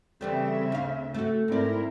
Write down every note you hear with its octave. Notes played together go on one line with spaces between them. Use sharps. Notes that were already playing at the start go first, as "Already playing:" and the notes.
C#3 E3 G3 A3 C4 E5
D2 F5
A3 F#4
G#2 C4 E4 A#4 D5